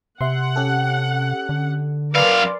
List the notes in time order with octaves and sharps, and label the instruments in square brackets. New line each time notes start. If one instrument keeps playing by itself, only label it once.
[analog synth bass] C3 [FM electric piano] E5 C6 [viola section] F#5
[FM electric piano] C#4 G4 A4
[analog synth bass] D3
[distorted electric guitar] F#2 F5 [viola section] A#4 D5 [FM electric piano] B4 G#5 C6